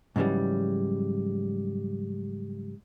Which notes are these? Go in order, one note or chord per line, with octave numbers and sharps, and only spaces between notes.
G#2 C#3 E3 F#3 G3